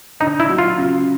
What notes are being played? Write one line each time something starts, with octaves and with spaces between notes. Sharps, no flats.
D3 D#4
E4
F#3
F4
C#3